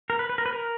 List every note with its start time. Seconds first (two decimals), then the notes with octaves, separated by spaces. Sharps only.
0.10 A#4
0.19 B4
0.29 B4
0.38 A#4
0.46 B4
0.53 A#4